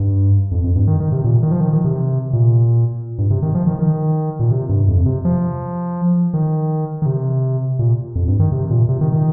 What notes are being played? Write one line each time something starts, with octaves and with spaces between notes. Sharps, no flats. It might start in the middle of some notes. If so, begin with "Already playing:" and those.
Already playing: G2
F2
F2
G2
D#3
D#3
C3
A#2
D#3
F3
D#3
D#3
C3
A#2
G2
C3
D#3
F3
D#3
D#3
A#2
C3
G2
F2
C3
F3
D#3
D#3
C3
A#2
F2
G2
D#3
C3
A#2
C3
D#3
D#3